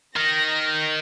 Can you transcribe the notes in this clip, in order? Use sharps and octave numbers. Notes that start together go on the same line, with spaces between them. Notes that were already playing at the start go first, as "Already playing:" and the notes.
D#3 A#6